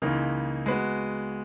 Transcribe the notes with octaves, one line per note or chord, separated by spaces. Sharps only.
C#2 C#3 E3 A#3 D#4
G#3 B3 F#4 B4